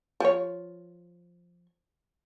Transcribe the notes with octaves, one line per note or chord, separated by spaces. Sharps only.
F3 C#5